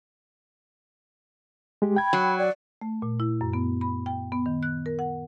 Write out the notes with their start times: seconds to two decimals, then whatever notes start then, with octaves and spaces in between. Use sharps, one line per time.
1.82 G#3 G4
1.96 G5 B5 G#6
2.13 F#3
2.38 D5
2.81 A3
3.02 A#2
3.20 E4
3.41 F#2
3.53 B3
3.81 B5
4.06 G5
4.32 B3
4.46 D#3
4.63 F#6
4.86 A#4
4.99 F#5